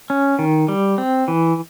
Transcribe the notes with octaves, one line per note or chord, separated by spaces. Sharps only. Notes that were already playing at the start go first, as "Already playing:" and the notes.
C#4
D#3
G3
C4
E3